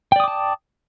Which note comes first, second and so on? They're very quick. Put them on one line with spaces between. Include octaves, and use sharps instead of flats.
G5 D5 D#6 D6 A5